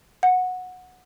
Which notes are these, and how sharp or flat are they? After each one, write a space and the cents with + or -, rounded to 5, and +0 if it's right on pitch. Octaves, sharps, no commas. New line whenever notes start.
F#5 -15